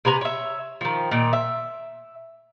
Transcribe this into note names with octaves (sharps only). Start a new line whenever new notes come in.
C3 B4 G#5 A#5
C#5 E5
D#3 F3
A#2 D#3
E5